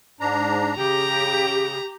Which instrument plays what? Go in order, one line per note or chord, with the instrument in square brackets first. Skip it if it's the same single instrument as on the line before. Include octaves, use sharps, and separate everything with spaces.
[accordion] G#2 D4 A#5
[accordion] C#3 [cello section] G4 [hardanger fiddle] A#5